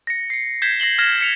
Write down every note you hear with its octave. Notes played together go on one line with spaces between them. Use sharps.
A#6 C#7
C7 C#7
G6 G#6 B6 C7 E7 G7
A#6 C7 F#7 G7
F6 G#6 A#6 E7
B6 C#7 F7